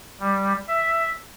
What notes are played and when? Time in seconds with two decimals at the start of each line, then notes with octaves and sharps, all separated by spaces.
0.20 G3
0.68 E5